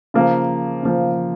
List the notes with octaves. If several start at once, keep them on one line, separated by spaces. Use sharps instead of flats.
C#3 F3 A#3
C#3 F3 A#3